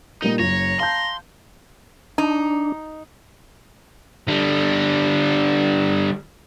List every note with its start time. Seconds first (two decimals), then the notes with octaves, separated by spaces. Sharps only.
0.22 A#2 G3 A#3 D#4
0.39 F#1 C#5 A#5
0.80 F5 A5 C6 G6
2.18 D4 D#4
4.28 D3 G3